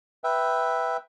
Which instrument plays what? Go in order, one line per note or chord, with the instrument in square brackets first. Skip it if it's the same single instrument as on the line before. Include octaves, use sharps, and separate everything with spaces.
[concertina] B4 E5 G5